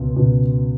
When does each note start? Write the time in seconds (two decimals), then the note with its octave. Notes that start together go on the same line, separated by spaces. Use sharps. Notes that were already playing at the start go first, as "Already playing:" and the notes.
Already playing: C#2 B2
0.14 C#2 B2